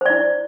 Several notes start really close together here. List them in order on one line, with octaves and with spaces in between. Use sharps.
C5 D5 E4